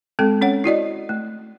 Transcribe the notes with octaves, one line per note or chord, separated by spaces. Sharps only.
G#3 C4 A4 G5
C#4 C#5 F#5
E4 F#4 D5 D#5
A3